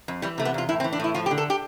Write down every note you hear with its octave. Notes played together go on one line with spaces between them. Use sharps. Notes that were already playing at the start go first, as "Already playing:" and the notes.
F2
E3 G3
C3 A3
B3
E2 F4
A2 E4
C4
E3
D4
A2 E4
F3 F4
G4
D3
A4
G4